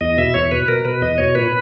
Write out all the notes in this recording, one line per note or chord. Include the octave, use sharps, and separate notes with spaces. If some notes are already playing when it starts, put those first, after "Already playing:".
E2 D#5
B2 E5
E2 C#5
B2 B4
B2 A#4
B2 B4
E2 D#5
B2 C#5
A#2 B4